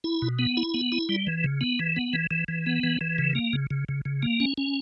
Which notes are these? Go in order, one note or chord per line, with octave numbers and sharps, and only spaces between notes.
E4
B2
B3
E4
B3
E4
G3
E3
C#3
B3
E3
B3
E3
E3
E3
B3
E3
E3
C#3
A#3
C#3
C#3
C#3
C#3
A#3
C#4
C#4